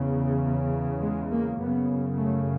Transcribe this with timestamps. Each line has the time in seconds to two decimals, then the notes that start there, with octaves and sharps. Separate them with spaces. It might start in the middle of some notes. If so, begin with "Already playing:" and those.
Already playing: E2 C#3
1.02 G#3
1.31 A#3
1.60 F#2 C#3 B3
2.18 A3